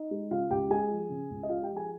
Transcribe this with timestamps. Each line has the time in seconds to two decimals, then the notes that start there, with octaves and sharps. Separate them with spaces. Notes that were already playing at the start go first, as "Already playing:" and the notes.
Already playing: D#4 D#5
0.11 G#3
0.31 C#3 F4 F5
0.50 C#2 G4 G5
0.70 G#3 G#4 G#5
0.91 F3
1.09 C#3
1.30 C#2
1.43 D#5
1.49 G#3 F4 F5
1.62 G4 G5
1.70 F3
1.76 G#4 G#5